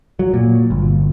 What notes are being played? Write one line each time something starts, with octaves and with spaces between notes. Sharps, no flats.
F#3
A#2
G1